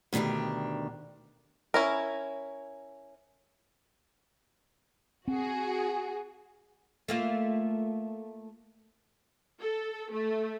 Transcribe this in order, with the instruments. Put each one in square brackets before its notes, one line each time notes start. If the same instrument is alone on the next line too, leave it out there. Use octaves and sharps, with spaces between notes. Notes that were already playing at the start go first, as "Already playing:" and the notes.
[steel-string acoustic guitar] D2 B2 D#3 D4 G4
[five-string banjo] C#4 E4 A#4
[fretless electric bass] C4 [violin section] F#4 G#4
[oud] A3 A#3 F4
[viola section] A4
A3